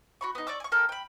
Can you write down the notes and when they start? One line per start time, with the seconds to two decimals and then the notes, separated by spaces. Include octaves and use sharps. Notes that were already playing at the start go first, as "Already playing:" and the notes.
0.21 F#4 B5 C#6
0.35 B3 D#4
0.47 D5 C#6 D6 E6
0.60 G#5 C#6
0.72 A4 A#4 G5
0.89 G5 B5